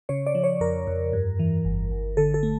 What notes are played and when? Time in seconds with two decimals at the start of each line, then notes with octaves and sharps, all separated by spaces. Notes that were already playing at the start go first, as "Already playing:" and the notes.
0.09 C#3 C#5
0.26 D5
0.35 F3
0.44 C#5
0.60 F2 A#4
0.87 F2
1.13 G2
1.39 E3
1.65 G1
1.91 G1
2.17 D3 A4
2.34 A4
2.43 A3